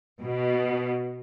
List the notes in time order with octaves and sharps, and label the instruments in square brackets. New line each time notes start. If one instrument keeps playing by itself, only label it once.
[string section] B2